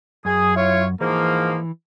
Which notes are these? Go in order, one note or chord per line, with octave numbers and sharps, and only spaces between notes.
F#2 G#4
E4 F4 C#5
G#2 E3 F3 A#3